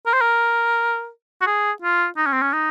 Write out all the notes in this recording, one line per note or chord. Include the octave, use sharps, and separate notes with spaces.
A#4
C5
A#4
F#4
G#4
F4
D#4
C#4
C4
C#4
D#4